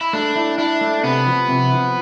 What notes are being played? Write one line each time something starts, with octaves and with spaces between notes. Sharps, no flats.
E4
A3 D4
E4
D4 E4
A3
C3 B3
F3
C3
F3